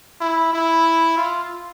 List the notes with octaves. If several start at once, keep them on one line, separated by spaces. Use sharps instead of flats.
E4
E4
F4